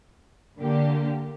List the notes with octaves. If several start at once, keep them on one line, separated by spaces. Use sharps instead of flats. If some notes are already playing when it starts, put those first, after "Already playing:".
D3 A#3 G4